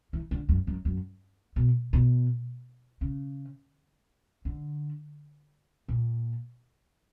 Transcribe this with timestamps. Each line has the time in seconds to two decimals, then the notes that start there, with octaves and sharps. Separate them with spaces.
0.13 E3
0.31 D3
0.49 F#2
0.67 F#2
0.85 F#2
1.56 B2
1.93 B2
3.01 C#3
4.45 D3
5.88 A#2